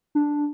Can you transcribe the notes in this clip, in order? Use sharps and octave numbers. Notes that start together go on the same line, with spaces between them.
D4